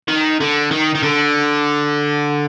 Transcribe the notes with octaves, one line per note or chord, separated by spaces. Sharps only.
D#3
D3
D#3
D#3
D3